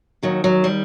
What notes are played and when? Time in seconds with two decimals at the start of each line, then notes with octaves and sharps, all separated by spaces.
0.23 D#2 D#3 F#3
0.44 F#3
0.64 G3